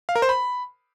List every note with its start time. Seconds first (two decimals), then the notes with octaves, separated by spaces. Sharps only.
0.09 F5
0.16 A#4
0.22 C5
0.29 B5